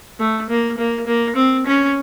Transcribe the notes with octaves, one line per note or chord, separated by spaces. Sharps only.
A3
A#3
A#3
A#3
C4
C#4